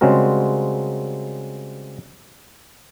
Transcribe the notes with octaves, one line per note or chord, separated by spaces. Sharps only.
C#3 G3 G#3 C4 F#4 A#4